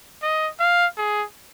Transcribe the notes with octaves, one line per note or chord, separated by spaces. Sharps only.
D#5
F5
G#4